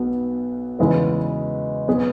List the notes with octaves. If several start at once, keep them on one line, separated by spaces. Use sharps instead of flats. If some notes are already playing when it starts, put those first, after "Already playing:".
Already playing: B1 B2 B3
E2 C#3 G#3 E4 B4
B2 F#3 B3 G#4